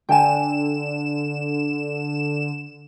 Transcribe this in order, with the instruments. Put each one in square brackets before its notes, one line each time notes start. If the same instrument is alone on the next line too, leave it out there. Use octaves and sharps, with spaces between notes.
[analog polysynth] D3 E7 [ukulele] G5 G#5